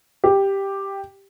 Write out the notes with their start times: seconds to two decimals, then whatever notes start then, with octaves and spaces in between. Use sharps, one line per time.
0.24 G4